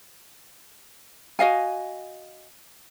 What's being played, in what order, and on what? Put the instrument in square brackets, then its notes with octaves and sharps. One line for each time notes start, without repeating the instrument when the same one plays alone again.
[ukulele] F#4 D#5 F5 G#5